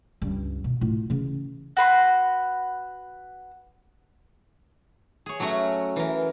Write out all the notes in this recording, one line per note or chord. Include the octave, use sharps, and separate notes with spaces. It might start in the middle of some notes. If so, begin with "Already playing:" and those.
C#2 G2
B2
A2 F4
C#3 E3
F#4 B4 C6
G#4 C#5
F#3 A3 C#4 F#4
E3 A#4